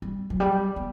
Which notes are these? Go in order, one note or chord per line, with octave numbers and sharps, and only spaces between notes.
G3
F#3
G3
B3